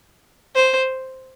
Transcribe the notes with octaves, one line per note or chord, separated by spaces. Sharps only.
C5